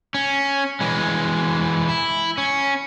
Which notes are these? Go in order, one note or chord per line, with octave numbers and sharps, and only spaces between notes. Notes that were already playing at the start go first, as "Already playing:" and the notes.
C#4
E3 G#3
E4
C#4